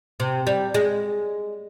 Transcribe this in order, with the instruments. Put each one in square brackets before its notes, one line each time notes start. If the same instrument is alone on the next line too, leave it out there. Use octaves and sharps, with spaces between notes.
[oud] C3
G3
G#3